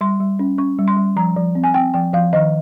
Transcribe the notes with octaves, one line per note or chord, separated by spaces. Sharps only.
G3 C6
G3
C#4
C#4 C#6
G3
C6
G3
F3 A#5
F3
C4
G#5
C4 G5
F3 G5
F3 F5
D#3 D#5